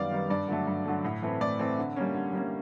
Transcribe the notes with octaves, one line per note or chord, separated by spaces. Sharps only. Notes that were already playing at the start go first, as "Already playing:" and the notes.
Already playing: F#2 D#3 G3 B3 D5 F5
D#3 G3 B3
G2 D5
D3 F#3 A3
G2
D3 F#3 A3
A2
E3 A3 C4
A2 D5
E3 A3 C4
D3
G3 A#3 C#4
D3
G3 A#3 C#4